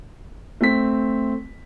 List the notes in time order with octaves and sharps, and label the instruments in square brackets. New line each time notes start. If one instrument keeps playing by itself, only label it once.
[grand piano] A3 C4 B6